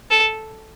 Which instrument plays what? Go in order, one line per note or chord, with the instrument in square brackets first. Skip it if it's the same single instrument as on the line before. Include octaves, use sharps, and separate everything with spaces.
[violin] A4